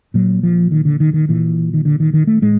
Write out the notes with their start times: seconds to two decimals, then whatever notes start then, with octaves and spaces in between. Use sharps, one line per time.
0.14 A#2 F#3
0.43 F3
0.72 D#3
0.85 D3
1.00 D#3
1.14 D#3
1.29 A#2 E3
1.74 D#3
1.85 D3
2.00 D#3
2.14 D#3
2.27 A3
2.41 A2 G#3